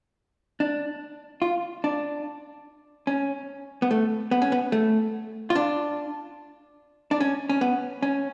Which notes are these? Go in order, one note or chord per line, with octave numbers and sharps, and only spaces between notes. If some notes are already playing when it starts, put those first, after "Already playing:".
D4
F4
D4
C#4
B3
A3
B3
C#4
B3
A3
F4
D4
D4
C#4
C#4
B3
C#4